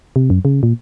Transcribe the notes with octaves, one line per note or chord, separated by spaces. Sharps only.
C3
F#2
C#3
A#2